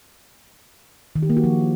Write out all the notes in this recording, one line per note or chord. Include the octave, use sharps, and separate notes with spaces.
D#3
G4
A#3
F#4
F3